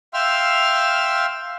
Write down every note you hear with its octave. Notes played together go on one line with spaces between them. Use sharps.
E5 F5 G5 C6 E6 F6